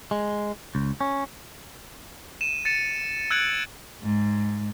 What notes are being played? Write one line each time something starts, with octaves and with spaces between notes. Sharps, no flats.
G#3
C#2
C#4
D#7 E7
A6 C#7 D#7 E7
E6 F#6 G#6 C#7 D7 F#7
G#2